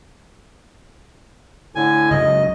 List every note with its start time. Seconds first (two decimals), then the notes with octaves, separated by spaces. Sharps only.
1.75 A2 D3 G#5
2.11 C#2 F#2 F#3 D#5